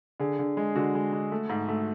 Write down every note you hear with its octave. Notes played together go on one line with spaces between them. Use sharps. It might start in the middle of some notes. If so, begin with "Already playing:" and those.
D3 G#4
D3
G#3
D3 F#4
G#3
G#3
A3
G#2
A3